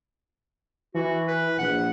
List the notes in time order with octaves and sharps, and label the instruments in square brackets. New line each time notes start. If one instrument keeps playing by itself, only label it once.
[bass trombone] E3 [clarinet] F#4
[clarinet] B4
[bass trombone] A#1 [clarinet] F#5